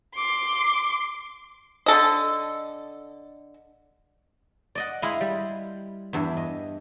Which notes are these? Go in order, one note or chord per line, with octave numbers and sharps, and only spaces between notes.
C6 D6
D3 A4 D#5
D5 D#5 F#5
G#3 E4 D#5 F5 A#5 B5
G3
E2 G2 E5
D#5